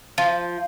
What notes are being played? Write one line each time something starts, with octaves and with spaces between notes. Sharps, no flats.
F3